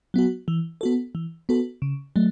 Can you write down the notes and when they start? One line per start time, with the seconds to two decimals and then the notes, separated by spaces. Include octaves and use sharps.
0.14 F#3 B3 F#4
0.48 E3
0.81 B3 F#4 A4
1.15 E3
1.49 B3 F#4 A4
1.82 C#3
2.16 F#3 A3